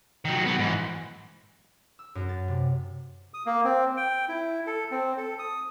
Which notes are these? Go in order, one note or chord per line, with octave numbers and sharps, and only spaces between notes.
D#3 F#3
F#3 B3
G#2 E3
E6
F#2
A6
C3
D#6
A#3
C4
G5
E4
A4
C4
A4
D#6